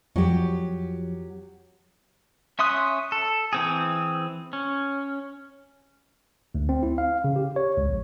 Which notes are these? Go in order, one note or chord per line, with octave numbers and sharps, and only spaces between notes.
F2 F#3 G4
C#4 E5 C6 D#6 F#6
A4
E3 C4 G#4
C#4
D2
C4
E4
F5
C#3
G4
C#5
C#2
A#1